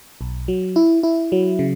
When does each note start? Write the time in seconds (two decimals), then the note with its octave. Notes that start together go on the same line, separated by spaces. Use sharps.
0.21 B1
0.48 F#3
0.76 E4
1.03 E4
1.32 F#3
1.59 C#3